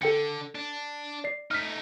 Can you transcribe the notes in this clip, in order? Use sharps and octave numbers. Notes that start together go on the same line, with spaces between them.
D3 A4 G5 C#7
D4
D5 C7
A3 D#4 F6 B6